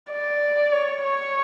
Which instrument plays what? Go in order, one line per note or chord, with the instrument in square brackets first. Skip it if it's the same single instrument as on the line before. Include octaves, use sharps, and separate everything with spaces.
[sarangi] D5
C#5
C#5